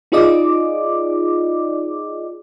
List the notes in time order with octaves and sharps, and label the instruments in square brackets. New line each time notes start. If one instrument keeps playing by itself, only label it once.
[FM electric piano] D#4 F4 G#4 D5 D#5 D6